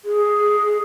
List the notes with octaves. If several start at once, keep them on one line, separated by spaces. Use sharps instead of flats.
G#4